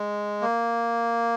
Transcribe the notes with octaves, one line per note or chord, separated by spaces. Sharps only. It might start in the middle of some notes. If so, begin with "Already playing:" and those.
Already playing: G#3
A#3